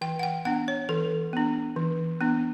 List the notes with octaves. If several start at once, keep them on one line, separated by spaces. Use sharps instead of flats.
E3 G5
F#5
G5
B3 D4 F#5
C#5
E3 A4
B3 D4
E3
B3 D4